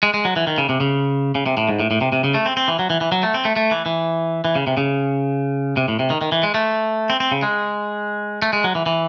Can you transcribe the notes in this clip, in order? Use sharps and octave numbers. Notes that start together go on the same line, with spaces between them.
G#3
G#3
F#3
E3
D#3
C#3
C3
C#3
C#3
C3
A2
G#2
A2
A2
C3
C3
C#3
A3
C4
C4
E3
F#3
E3
E3
F#3
A3
C4
A3
A3
E3
E3
E3
C#3
C3
C#3
C3
A2
C3
D#3
D#3
E3
G#3
A3
C4
C4
C#3
G#3
A3
G#3
F#3
E3
E3